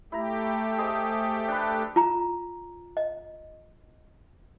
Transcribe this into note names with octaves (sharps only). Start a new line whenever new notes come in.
A3 E4 G4 A#5
G#4 C5 D#5
D4 A4 B4
F4 A#5
D#5